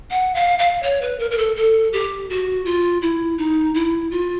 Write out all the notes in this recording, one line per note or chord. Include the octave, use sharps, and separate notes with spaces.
F#5
F5
F5
C#5
B4
A#4
A#4
A4
A4
G4
F#4
F4
E4
D#4
E4
F4